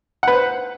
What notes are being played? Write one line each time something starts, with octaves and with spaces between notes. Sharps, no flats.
B4 C5 F#5